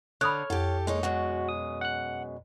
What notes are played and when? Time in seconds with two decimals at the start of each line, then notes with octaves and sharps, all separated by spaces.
0.21 D3 C#5 B5 D#6 F6 F#6
0.50 F2 G4 A4
0.87 G#3 A#3 D#4 C#5
1.03 F#2 B2 G#3 F#4
1.49 D#6
1.81 F#5 F#6